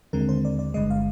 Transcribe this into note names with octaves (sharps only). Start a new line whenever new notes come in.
D#2 D3 G#3 C4 A#4
C5
D5
D5
G1 G2 D3 G#3 D#5
F5